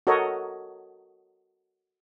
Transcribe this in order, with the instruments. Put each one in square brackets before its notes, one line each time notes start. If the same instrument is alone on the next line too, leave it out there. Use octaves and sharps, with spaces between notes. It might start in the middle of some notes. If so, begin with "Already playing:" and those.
[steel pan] F#4 A4 A#4 C#5 D#5